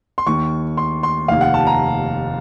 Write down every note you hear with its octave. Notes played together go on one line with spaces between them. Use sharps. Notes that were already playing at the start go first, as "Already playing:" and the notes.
C6
D#2 D#3 C#6
C6
C6
F1 D#2 D#3 F5
F#5
A5
A#5